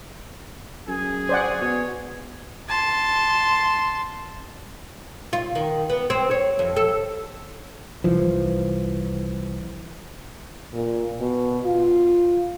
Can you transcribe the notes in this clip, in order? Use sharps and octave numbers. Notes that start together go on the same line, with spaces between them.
F#2 G#4 G#5
C5 D5 F#5
B2 C#5
A5 C6
F4
D#3
B3
C4
C#5
F2
A4
C2 E3 F3
A#2
B2
F4